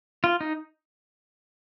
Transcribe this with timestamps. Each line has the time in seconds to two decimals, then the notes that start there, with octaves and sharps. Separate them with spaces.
0.24 F4
0.41 D#4